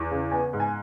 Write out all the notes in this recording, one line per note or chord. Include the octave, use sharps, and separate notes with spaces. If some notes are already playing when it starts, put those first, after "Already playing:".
Already playing: E2
C#3
B3 G#5
G#2
G#5